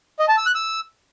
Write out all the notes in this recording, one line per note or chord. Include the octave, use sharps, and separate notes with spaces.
D#5
A5
E6
F#6
E6